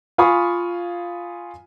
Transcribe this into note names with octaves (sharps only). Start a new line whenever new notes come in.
F4 F5 G#5 B5 C#6 D#6